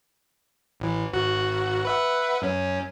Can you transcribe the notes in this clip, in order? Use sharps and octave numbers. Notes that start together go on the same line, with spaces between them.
A1 E3
G#1 F#4 F#6
B4 E5 F#5
F#2 C#4